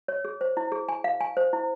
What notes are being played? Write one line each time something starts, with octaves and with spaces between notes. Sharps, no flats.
C#5
G#4
C5
E4
G#4
G#5
F5
G#5
C5
E4